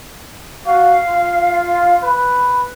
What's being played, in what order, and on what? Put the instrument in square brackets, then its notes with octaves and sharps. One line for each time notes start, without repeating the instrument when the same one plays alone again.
[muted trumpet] F#4 [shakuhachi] F5
[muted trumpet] F4
B4